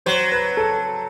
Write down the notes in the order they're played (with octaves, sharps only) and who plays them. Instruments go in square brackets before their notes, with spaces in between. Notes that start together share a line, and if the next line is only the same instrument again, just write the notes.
[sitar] F#3 [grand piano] C5
[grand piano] B4
A4